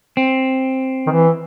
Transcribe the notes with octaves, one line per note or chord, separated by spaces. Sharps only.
C4
D#3
E3